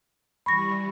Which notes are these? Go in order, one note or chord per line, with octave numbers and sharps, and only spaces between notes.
E3 G3 B5 C#6 A#6